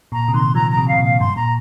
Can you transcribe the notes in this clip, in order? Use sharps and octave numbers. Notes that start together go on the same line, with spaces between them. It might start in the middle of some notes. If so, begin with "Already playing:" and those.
A#2 A#5
C3
D#3 C6
F3 A#5
A#5
C3
C3 F5
A#2
F5
G2 C6
A#2 A#5